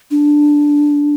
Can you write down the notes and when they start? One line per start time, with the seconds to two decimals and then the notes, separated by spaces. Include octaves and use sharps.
0.11 D4